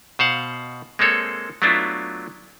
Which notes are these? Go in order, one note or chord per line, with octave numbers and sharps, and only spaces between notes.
B2 C5 F5 F#5
G#3 A#3 C4 A4 C#5
F#3 A3 B3 D4 E4 F4